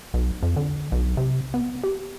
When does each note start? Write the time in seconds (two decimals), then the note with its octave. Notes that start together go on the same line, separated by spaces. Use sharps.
0.14 B1
0.43 F2
0.56 D3
0.92 B1
1.17 C3
1.54 B3
1.83 G4